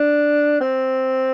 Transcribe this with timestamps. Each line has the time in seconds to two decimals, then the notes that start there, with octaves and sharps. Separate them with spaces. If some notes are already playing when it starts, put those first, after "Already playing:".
Already playing: D4
0.61 C4